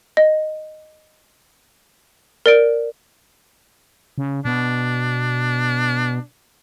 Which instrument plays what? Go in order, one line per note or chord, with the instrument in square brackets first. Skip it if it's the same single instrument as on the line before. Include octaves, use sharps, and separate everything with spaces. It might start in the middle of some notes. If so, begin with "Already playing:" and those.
[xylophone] D#5
A#4 D5 D7
[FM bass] C#3
[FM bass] B2 [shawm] D4